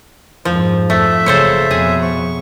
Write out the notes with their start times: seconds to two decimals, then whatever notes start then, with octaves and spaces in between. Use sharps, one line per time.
0.45 F2 G#2 F3
0.90 F2 A3 E5
1.26 F#1 C#3 A4 C5 C#5
1.71 F2 B2 G#4
2.02 C#6